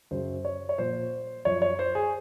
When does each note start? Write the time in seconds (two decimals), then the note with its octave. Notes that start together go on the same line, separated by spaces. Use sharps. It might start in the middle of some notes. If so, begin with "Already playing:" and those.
0.11 F#2 C#3 F#3 C5
0.45 C#5
0.69 C#5
0.78 A#2 F3 C5
1.45 F#2 F3 C#5
1.62 C#5
1.79 C5
1.95 G#4